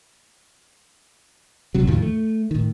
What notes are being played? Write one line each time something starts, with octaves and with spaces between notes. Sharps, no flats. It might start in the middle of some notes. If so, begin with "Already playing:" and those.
D#1 C3 F#3
E2 A2 D#3 F3
A3
A2 D#3